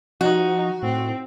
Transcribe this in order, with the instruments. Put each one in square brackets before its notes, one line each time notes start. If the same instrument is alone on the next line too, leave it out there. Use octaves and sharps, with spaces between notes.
[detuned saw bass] F3 [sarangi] D#4 [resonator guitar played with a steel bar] F#4
[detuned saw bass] A2 [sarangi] C4